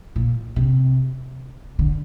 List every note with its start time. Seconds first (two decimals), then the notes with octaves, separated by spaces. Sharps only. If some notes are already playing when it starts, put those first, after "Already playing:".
0.16 A#2
0.56 C3
1.79 D3